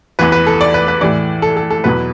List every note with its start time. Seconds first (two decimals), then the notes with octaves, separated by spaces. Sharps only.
0.19 E2 E3 B4
0.32 B4
0.46 A4
0.61 D5
0.74 B4
0.88 B4
1.01 A2 E3 D5
1.42 A4
1.57 A4
1.70 A4
1.84 E2 B2 F#3 B4